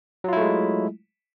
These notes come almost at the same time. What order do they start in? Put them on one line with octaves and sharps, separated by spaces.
F#3 F4 E4 A3 G#3